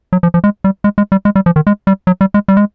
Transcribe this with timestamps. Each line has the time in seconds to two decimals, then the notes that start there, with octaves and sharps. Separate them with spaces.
0.13 F#3
0.23 F3
0.34 F3
0.44 G#3
0.64 G3
0.84 G#3
0.98 G#3
1.12 G3
1.25 G#3
1.36 G3
1.46 F3
1.56 D#3
1.67 G#3
1.87 G3
2.07 F#3
2.21 G3
2.34 G#3
2.48 G3
2.57 G#3